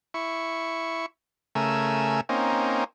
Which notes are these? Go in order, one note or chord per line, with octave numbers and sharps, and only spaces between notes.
E4 C#6
C#3 A3 A#4 G#5 E6
A#3 C4 C#4 D#4